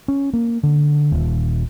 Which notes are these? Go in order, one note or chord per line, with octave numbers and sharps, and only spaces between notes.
C#4
A#3
D3
D#1